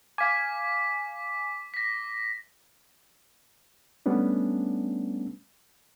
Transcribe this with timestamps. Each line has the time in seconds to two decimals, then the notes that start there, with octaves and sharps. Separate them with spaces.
0.18 F5 G#5 D6 B6
1.74 A#6 B6
4.06 G3 A3 B3 C#4 D4